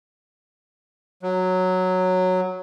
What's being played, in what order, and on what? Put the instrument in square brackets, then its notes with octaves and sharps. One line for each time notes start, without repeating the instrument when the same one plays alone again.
[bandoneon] F#3